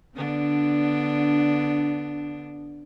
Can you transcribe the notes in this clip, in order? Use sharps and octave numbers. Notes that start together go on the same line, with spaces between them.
D3 B3 D4